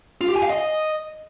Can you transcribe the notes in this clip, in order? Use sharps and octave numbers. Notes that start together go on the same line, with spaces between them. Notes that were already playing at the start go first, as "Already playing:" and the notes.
F4
G4
G#5
F5
D#5